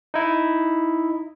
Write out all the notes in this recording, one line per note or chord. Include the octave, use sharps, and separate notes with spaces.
D#4 E4